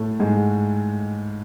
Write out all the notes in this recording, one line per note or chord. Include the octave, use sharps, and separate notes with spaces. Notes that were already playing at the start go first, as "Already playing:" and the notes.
Already playing: A2 A3
G#2 G#3